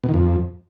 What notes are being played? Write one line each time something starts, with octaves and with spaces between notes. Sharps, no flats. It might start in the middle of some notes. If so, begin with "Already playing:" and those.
B2
D#3
F2